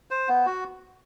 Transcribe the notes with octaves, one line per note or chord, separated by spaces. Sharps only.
C5
B3
F#4